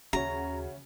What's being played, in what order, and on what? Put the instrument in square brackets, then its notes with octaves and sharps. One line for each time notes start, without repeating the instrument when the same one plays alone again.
[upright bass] D#2 [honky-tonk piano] C#3 F#4 [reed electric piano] C#5 E5 [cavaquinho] A#5